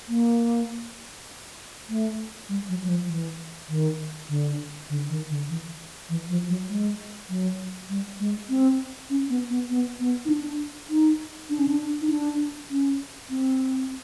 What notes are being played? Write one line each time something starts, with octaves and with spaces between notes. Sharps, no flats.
A#3
A3
G3
F#3
F#3
F3
E3
D#3
D3
D3
D#3
D3
E3
E3
F3
F#3
G#3
F#3
G3
G#3
C4
C#4
B3
B3
B3
B3
D#4
D4
D#4
D4
C#4
D4
D#4
D4
C#4
C4